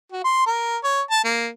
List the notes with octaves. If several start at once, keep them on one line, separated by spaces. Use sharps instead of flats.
F#4
C6
A#4
C#5
A5
A#3